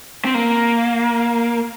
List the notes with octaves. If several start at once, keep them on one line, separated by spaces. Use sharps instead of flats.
C4
A#3